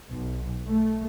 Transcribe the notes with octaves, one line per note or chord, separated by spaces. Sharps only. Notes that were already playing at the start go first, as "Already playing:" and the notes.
B1
A3